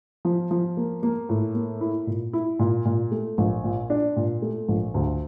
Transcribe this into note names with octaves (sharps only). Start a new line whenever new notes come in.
F3
F3
A#3
A#3
A2
A#3
E4
A#2
E4
A#2
A#2
A3
A#1
A#2
D4
A#2
A3
A#1
D2